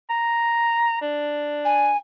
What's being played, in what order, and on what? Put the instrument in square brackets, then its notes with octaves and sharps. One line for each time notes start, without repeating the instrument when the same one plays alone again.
[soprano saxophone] A#5
D4
[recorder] G#5